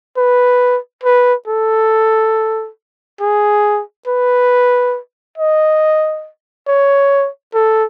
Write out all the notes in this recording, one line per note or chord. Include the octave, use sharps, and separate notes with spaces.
B4
B4
A4
G#4
B4
D#5
C#5
A4